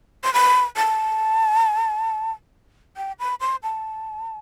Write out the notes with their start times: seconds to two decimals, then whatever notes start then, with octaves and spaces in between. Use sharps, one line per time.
0.24 C6
0.34 B5
0.77 A5
2.97 G5
3.19 B5
3.41 C6
3.63 A5